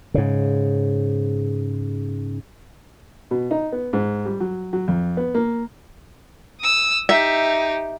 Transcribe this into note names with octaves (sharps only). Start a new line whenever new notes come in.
G#2 C#3
B2
D#4
B3
G#2
G3
F#3
F#3
F2
B3
A#3
D#6 E6
D#4 G4 E5